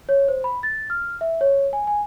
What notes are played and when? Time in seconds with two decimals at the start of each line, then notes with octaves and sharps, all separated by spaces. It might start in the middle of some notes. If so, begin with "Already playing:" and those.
0.09 C#5
0.28 C5
0.44 B5
0.63 A6
0.90 F6
1.21 E5
1.41 C#5
1.73 G#5
1.87 G#5